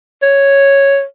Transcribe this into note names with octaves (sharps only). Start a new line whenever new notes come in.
C#5